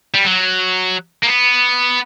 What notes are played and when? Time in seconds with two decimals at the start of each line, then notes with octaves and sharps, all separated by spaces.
0.14 G3
0.24 F#3
1.23 A#3
1.27 B3